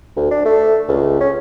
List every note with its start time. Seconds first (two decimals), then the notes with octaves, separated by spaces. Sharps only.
0.16 D2
0.31 D4
0.45 A3
0.88 C#2
1.21 C#4